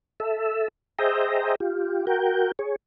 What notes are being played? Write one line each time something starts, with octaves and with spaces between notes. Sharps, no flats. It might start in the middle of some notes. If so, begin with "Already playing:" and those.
A4 E5
G#4 C5 D#5 E5 G5 A#5
F4 G4
F#4 A#4 G5
G#4 C#5